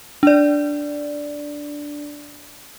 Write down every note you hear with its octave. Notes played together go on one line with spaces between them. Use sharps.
D4 D5